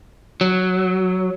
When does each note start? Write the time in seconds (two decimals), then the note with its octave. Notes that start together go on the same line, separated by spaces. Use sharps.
0.41 F#3